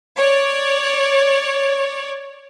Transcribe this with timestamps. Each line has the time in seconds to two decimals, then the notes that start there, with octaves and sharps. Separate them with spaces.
0.16 C#5 D5